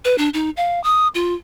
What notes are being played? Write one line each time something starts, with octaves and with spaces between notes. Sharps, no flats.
B4
D4
D#4
F5
D#6
F4